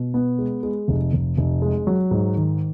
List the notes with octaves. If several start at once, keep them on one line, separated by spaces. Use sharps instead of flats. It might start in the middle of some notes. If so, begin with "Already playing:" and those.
Already playing: B2
B3
G#3
G#3
F1
F1
F1
G#3
F#3
G#2
D#3